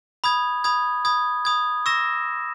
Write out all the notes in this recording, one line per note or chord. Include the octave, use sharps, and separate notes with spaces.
B5 D#6 G#6
B5 D#6 G#6
B5 D#6 G#6
B5 D#6 G#6
C#6 E6 A#6 E7